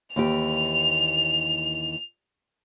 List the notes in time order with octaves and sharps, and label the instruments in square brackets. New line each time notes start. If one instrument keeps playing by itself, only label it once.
[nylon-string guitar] D#2 E3 G4 [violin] F7